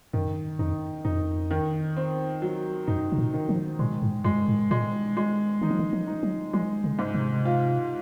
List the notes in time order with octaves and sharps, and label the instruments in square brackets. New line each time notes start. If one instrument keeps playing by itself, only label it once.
[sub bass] F#2 [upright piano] D#3
[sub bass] F2 [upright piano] D#4
[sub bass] F2 [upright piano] D#4
[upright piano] D#3
C4
F#3
[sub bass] F#2 [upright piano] D#4
[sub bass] C3
A#2
[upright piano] D#3
[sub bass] F3
[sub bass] A#2 [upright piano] G#3
[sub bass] G#2
[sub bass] F#2 [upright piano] G#3
[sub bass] G#2
[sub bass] A#2 [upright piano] G#3
[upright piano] G#3
[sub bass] D#3 [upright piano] D#4
[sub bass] F3
D#3
F3
[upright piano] D#4
[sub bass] F#3
[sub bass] F3 [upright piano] G#3
[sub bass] C#3
[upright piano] G#2
[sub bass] C3
[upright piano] F4